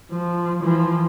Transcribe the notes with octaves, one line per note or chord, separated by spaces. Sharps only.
F3
E3 F3